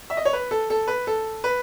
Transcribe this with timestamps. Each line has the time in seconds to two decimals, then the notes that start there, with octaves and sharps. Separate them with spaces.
0.10 E5
0.17 D#5
0.25 C#5
0.33 B4
0.51 A4
0.70 A4
0.87 B4
1.07 A4
1.44 B4